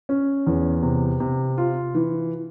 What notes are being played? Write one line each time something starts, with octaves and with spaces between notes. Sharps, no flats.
C#4
E2
C3
C3
F4
E3